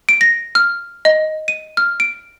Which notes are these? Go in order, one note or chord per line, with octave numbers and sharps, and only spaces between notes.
D7
A#6
F6
D#5
D#7
F6
D7